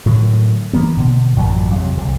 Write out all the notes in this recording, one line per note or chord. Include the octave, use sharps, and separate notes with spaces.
A2 D3 D#3 F#3
E3 A#3 B3
B2 D3
A1 F#2 A#2 F#3
F2 C3 F#3
C2 D3